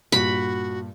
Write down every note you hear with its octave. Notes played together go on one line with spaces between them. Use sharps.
G2 A#2 F#4 B5